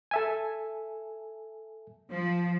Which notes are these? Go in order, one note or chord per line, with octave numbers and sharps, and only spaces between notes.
A4 E5 G#5
F3